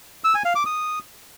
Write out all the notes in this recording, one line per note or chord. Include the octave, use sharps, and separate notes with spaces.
E6
G#5
F5
D6
D#6